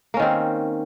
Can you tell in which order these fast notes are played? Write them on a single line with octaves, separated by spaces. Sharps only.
A#3 C#4 D#3 C4